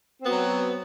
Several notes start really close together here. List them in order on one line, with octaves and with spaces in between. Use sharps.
C4 B3 F#4 F#3